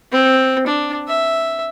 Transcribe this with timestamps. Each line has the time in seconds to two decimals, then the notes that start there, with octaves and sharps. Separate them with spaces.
0.12 C4
0.67 D4
1.08 E5